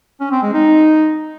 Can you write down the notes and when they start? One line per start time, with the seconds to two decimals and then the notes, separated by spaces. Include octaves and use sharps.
0.20 C#4
0.31 C4
0.42 G#3
0.53 D#4